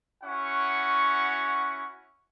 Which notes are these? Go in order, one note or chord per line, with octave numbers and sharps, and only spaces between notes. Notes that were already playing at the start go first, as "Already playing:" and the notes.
C#4 E4 F#4 F#5 C#6